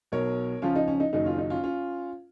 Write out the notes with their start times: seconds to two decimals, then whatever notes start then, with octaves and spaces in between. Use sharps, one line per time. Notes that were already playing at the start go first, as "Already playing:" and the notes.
0.12 B1 B2 F#3 A#4 C#5
0.62 C#2 C#3 F3 C#4 F4
0.76 D#4
0.88 C#4
1.00 D#4
1.13 F#1 F#2 D#3 F#3 D#4
1.25 C#4 F4
1.38 D#4
1.50 C#4 F4
1.63 C#4 F4